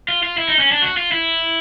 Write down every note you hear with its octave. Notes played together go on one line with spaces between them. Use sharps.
F4
F4
E4
D#4
C#4
D4
F#4
F4
E4